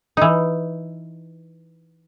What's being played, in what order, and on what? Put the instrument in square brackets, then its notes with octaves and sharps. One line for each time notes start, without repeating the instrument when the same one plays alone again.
[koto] E3 D#4